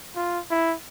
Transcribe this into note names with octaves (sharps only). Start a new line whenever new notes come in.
F4
E4